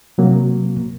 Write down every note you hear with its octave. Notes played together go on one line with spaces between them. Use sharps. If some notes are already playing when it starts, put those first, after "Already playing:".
C3 F#3 A#3